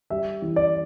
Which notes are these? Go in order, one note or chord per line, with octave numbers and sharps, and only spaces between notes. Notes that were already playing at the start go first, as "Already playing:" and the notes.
G3 E5
E3
D5